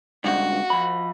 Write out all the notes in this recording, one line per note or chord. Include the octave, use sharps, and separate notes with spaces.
C#2 G2 F#4
F3 B5